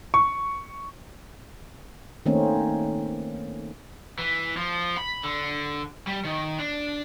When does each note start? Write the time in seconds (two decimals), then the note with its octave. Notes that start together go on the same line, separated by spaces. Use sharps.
0.14 C#6
2.26 D#3 A3 A#3 C4 C#4 D#4
4.19 E3
4.57 F3
4.97 B5
5.23 D3
6.07 G3
6.25 D#3
6.59 D4